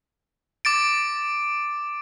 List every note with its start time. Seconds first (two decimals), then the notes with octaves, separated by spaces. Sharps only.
0.65 D6 A6 D7